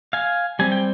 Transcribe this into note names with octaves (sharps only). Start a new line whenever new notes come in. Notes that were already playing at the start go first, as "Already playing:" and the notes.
F5 G#5
G3 C4 G#5
G5